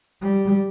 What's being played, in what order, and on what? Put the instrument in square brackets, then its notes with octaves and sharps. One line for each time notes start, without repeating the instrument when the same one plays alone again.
[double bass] G3